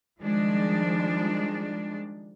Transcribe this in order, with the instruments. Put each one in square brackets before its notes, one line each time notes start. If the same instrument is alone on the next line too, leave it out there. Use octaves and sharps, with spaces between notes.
[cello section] D#3 F3 G3 G#3 D4